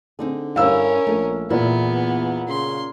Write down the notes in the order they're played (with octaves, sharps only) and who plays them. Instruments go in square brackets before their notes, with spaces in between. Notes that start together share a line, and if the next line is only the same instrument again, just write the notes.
[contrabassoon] D3 [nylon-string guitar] C4 D#4 G#4
[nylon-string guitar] G2 G3 E4 [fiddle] C#4 A#4 [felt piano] F5 E6
[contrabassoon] A#1 [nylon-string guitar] A3
[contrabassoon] E2 [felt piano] A#2 [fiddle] B3 [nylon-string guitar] E4
[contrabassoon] C#3 [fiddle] C6